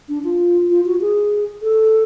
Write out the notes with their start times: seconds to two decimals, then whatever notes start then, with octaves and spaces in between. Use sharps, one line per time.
0.09 D4
0.24 F4
0.70 F4
0.85 F#4
1.01 G#4
1.62 A4